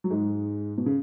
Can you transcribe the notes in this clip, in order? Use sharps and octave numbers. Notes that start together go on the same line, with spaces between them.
F#3
G#2 G#3
B2
C#3